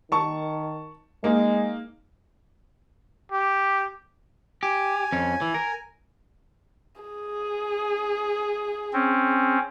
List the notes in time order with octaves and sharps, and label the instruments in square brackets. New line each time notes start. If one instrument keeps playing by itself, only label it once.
[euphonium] D#3 [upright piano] A5 C#6
[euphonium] G#3 [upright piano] A#3 D#4
[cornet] G4
[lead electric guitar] G4 [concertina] G#5
[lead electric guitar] F2 C#4
E3
A#4
[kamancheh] G#4
[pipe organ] C4 C#4